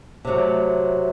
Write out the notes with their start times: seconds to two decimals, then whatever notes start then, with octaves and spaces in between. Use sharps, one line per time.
0.25 C3 F#3 A3